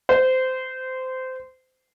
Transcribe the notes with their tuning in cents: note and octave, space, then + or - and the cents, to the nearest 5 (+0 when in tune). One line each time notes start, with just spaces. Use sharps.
C5 -20